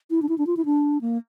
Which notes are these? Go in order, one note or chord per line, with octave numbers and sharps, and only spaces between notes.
E4
D4
E4
D4
F4
E4
D4
A#3